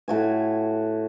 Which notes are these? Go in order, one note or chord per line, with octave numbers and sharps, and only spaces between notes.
A2 F#4 G#5